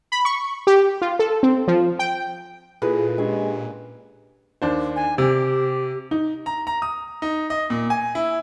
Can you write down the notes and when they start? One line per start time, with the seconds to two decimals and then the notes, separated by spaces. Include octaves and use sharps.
0.12 B5
0.25 C#6
0.67 G4
1.02 F4
1.19 A4
1.43 C4
1.68 F3
1.99 G5
2.82 A#2 E4 F4 G#4 A4 B4
3.18 G#3 C#4 D4 G4 G#5
4.62 D#2 D4 C5
4.96 G#5
5.18 C3 G4
6.11 D#4
6.46 A#5
6.67 A#5
6.82 D#6
7.22 D#4
7.50 D#5
7.70 A#2
7.90 G#5
8.15 E4